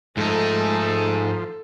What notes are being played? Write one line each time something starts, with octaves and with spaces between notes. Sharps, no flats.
G#2 F3 A3 D#4 A4